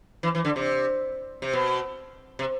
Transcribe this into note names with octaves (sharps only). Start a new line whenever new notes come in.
E3
E3
D3
C3
C3
B2
C3